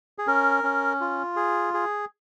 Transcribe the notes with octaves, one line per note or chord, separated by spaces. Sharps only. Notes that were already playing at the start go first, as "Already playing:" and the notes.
G#4
C#4 A#4
C#4
F4
G#4
G#4